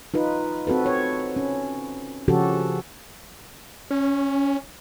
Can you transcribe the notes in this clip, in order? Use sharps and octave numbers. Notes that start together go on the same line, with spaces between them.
D#4 F4 B4
C4 F#4 A4 B4
C#5
C#4
C#3 F3 C#4 F#4 G4 A4
C#4